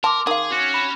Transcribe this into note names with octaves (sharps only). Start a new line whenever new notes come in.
A#4 A5 C6 D6
D#3 G#4 F5
C#4 F#4
B5 E7